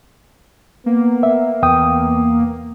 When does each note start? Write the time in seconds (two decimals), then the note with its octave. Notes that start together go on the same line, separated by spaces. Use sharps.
0.86 A#3 B3
1.23 E5
1.63 E2 B3 G5 D#6